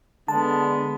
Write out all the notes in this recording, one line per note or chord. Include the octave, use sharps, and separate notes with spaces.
D3 G#3 B3 A5